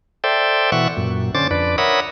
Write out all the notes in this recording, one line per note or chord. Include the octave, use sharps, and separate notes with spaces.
A4 C5 D5 E5 G5
B2 E3 E5 F#5 C#6
F#2 A#2
D3 C#4 C5 D6 A6
F2 D4 B4 D5
A#4 C#5 E5 F#5 B5 D#6